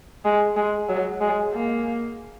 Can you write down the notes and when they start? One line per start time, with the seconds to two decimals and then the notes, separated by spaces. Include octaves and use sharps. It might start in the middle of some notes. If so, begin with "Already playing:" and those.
0.25 G#3
0.57 G#3
0.89 F#3
1.21 G#3
1.54 A#3